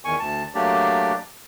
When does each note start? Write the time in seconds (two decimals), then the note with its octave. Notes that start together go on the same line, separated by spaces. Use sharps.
0.05 E2 D#3 G#5 C#6
0.19 D2 A5
0.55 F#3 A3 A#3 D4 G4 D5